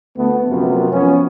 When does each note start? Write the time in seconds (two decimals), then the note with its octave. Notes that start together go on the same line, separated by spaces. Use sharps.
0.17 D2 A3 B3
0.48 F#2 C3 F3 B3 F4
0.91 F3 B3 C#4